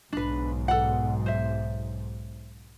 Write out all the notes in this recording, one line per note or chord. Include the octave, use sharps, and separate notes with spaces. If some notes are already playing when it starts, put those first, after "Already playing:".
B1 G#2 D4 B4
A4 F#5
C5 E5